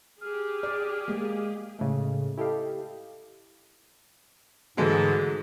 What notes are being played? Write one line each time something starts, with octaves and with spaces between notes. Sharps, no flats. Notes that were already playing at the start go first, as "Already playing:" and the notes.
G4 G#4 F6
D5
G#3 A#3
A2 C#3 G#3 A3
E4 G4 A4 D#5 F5
G#2 D3 E3 F#3 G#3 A3